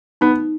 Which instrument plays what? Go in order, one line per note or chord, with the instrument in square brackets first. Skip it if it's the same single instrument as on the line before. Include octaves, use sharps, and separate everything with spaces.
[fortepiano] B3 [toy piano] D#4